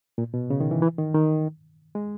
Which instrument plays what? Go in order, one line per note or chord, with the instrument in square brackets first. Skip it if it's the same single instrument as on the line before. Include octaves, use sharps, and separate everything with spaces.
[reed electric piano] A#2
B2
C#3
D#3
E3
E3
D#3
D#3
G#3